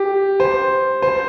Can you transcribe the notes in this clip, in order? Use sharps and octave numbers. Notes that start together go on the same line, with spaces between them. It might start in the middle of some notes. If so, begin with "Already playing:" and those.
Already playing: G4
C5
C5